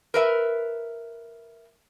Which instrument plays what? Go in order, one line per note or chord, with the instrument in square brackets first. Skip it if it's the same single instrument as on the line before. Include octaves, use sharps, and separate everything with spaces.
[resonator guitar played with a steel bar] A#4 B4 E5